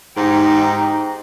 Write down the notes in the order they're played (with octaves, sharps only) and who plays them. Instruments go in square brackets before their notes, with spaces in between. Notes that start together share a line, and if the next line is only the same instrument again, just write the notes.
[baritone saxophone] G#2 [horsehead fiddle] D#4 G4